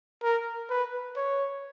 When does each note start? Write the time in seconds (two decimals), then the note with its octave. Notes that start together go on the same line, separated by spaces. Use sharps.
0.23 A#4
0.70 B4
1.16 C#5